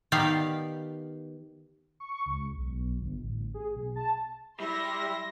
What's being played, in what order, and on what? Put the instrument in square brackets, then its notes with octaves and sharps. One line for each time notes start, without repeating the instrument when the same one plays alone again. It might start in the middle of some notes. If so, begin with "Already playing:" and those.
[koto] D#3 B3 G4 D5 F5
[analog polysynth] C#6
C#2
B1
G1
A1
G#4
B1
A5
[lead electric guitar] G3 [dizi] E4 [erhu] E5 [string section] C6 A#6